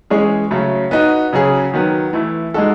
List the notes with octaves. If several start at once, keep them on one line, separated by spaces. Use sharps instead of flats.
E3 G#3 C#4 G#4 C#5
C#3 F#3 A3 C#4
B3 D#4 F#4
C#3 F#3 C#4 G#4
D#3 F#3 B3
E3 A3 E4
G#3 D#4 F#4 A4